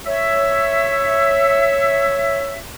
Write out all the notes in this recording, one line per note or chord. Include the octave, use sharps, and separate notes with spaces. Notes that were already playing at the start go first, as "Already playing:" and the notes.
C#5 E5